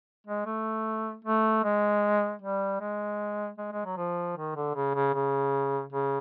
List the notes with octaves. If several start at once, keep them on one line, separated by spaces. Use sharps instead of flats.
G#3
A3
A3
G#3
G3
G#3
G#3
G#3
F#3
F3
D#3
D3
C#3
C#3
C#3
C#3